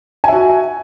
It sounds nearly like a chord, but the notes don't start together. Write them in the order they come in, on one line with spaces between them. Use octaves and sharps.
G#5 E5 F#4